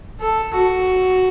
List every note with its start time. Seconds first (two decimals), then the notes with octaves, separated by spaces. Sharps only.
0.21 A4
0.54 F#4